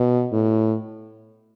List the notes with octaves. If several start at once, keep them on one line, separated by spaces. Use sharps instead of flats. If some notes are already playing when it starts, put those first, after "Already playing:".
Already playing: B2
A2